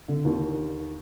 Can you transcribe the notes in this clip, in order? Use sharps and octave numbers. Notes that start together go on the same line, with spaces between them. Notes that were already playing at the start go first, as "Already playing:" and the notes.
D3
D#2 D#3